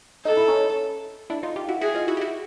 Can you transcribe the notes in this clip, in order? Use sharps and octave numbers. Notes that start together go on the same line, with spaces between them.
D#4 A4
E4
C#4 D#4
D4 E4
D#4 F4
F4 G4
E4 F#4
E4 F#4 G#4
D#4 F4
E4 F#4
G4
E4 F#4